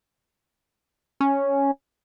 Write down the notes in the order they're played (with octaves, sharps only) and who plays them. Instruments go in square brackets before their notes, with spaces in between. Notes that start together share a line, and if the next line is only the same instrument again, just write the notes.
[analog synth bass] C#4